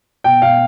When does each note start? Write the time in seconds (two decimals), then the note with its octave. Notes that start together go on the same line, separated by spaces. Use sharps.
0.24 B2 G5
0.42 B2 F5